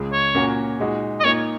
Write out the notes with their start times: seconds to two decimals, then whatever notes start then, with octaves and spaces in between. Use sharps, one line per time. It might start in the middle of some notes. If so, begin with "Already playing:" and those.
Already playing: C#2 C#3 G#3
0.12 C#5
0.34 A#2 A#3 C#4 F#4
0.79 A#2 G#3 D#4 F#4
1.20 D#5
1.24 A#2 A#3 D#4 C#5